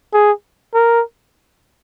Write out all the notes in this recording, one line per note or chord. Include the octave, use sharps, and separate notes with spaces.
G#4
A#4